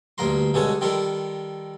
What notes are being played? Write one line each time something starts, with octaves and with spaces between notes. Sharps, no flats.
D2 G2 A#3 A#4 A#5 C6
G2 B2 G#3 C#4 A4 G#5
D#3 G3 F4 A4 A#4